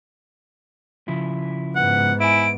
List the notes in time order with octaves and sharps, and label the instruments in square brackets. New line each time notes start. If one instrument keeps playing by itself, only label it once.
[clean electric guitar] C#3 F3 E4
[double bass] G#2 B3 [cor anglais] F#5
[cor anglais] E4 [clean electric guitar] E5 G#5 [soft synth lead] D7